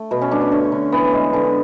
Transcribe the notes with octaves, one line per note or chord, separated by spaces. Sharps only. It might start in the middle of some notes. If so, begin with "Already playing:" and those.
Already playing: A3
B2 B3
C#4
A3 D4
C#4
D3 C#4
D3
E3 B3
G#3
D3